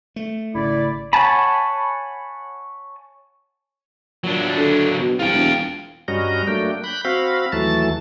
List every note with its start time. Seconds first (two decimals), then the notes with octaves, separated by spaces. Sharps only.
0.16 A3
0.54 G#1 C#3 E4 D5
1.13 C#5 F#5 G#5 A5 B5
4.24 A#2 F#3 D4
4.57 D3
4.99 B2
5.19 C2 F4 G5
5.33 E1
6.08 G2 G3 C#4 F#4 D#5 A#5
6.47 F#3 A3 A#3 D4 G5
6.84 B5 F#6 G6
7.05 C4 F#4 F5 B5
7.52 D#2 E3 F#3 A3 A5 A6